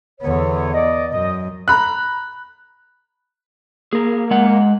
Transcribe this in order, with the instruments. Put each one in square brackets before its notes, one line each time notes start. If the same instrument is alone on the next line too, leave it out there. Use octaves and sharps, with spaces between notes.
[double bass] E2 B3 [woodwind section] D3 C#5
[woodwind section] D5 D#5
[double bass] F#2 [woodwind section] D#5
[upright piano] A#5 B5 F#6
[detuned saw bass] A#3 [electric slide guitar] G#4 A#4
[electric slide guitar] G#3 F#5